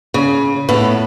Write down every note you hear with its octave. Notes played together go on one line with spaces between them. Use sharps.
C#3
A2 B3